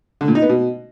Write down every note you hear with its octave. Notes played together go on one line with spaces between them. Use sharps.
D3
A#2
D#4
B3
B2